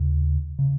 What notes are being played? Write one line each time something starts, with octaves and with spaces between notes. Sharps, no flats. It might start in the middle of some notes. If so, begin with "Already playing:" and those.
Already playing: D#2 C#3
C#3